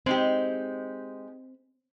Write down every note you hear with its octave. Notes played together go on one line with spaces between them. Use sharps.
G#3 C4 D#4 G4